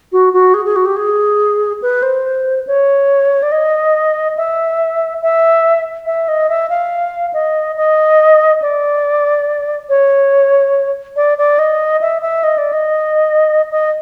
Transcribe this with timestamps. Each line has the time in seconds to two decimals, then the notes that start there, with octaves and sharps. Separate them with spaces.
0.12 F#4
0.33 F#4
0.54 G#4
0.65 G#4
0.76 F#4
0.86 G4
0.96 G#4
1.82 B4
2.02 C5
2.67 C#5
3.43 D5
3.52 D#5
4.37 E5
5.22 E5
6.06 E5
6.28 D#5
6.49 E5
6.70 F5
7.33 D#5
7.77 D#5
8.62 D5
9.89 C#5
11.16 D5
11.38 D5
11.59 D#5
12.01 E5
12.22 E5
12.43 D#5
12.58 D5
12.73 D#5
13.71 D#5